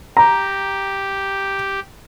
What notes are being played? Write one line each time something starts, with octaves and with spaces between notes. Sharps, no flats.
G4 A#5